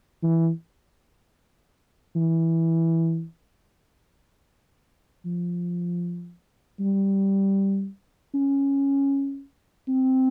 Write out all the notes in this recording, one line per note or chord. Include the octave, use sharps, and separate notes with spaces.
E3
E3
F3
G3
C#4
C4